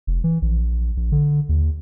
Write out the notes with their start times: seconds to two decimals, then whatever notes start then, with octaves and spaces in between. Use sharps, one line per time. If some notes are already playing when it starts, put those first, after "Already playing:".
0.07 F1
0.24 E3
0.42 A#1
0.97 A#1
1.12 D3
1.49 D#2